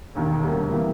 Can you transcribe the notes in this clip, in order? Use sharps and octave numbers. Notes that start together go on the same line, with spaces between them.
E1 D#2 D#3
E1 D2 D3 G3 A#3
C3 E3 G3 A#3